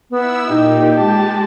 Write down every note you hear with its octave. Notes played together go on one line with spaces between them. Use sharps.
B3 E4 E6
A#2 D#4 G4
G#3 A5